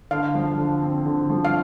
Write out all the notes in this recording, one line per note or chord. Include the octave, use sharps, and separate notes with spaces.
D3 F5
F3
D3
C4
D3
F3
F5